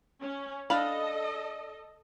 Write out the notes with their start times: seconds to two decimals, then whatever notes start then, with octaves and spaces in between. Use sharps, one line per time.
0.21 C#4
0.70 D4 A4 D#5 F5 B5